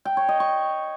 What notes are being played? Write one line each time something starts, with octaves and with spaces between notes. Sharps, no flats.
G5
C#5
D#5
C#6